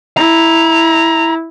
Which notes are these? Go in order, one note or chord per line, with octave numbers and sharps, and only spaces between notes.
E4 A#5